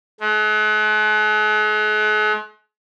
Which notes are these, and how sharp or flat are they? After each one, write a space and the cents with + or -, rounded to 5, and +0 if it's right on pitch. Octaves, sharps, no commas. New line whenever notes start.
G#3 +45